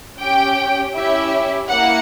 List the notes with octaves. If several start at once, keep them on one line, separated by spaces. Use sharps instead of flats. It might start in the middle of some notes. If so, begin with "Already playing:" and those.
C#4 G4 G5
C#4 E4 G4 E5
A#3 E4 F#5